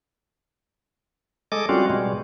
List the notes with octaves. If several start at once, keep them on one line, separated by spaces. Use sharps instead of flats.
G#3 A4 D#5 D6
G3 C4 C#4 F4 F#4
B2 G3 G#3